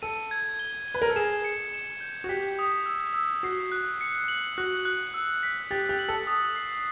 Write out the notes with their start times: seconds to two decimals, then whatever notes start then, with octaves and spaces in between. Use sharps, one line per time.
0.02 A4 D#7
0.31 G#6
0.59 G7
0.88 G7
0.94 B4
1.02 A#4
1.09 A4
1.16 G#4 E7
1.44 C#7
1.73 E7
2.01 G6
2.24 F#4
2.29 G4 B6
2.59 D#6
2.86 E6
3.14 E6
3.43 F#4 C7
3.72 F#6
4.01 C#7
4.28 F#7
4.58 F#4 F#6
4.85 F#6
5.14 E6
5.43 B6
5.71 G4 A6
5.89 G4
5.99 F#7
6.08 A4
6.27 D#6
6.56 C7